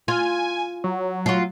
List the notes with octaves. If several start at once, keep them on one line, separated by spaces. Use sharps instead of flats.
F4 G#5
F#3
F4 F#4